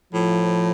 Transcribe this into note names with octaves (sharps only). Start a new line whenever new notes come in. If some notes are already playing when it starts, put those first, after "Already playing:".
A2 F3